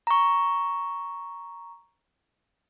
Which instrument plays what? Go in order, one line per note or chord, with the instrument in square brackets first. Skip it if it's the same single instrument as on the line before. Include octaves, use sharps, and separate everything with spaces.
[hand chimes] A#5 C#6